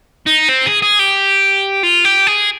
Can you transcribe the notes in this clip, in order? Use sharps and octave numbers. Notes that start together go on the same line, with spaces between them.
D#4
C4
G#4
G#4
G4
F4
G4
G#4